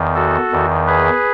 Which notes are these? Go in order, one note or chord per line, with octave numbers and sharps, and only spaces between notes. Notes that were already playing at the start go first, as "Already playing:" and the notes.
Already playing: E2 D#3
F#4 A4
E2 D#3
G#4 B4